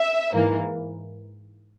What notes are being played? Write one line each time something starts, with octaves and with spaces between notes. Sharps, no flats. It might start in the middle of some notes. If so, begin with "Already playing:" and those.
Already playing: E5
G#2 E3 A#3